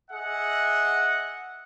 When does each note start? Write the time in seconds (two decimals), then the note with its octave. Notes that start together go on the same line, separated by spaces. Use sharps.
0.11 G#4 D#5 E5 F#5